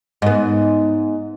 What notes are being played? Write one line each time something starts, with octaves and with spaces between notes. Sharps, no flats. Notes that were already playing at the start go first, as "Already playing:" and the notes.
G#2 B3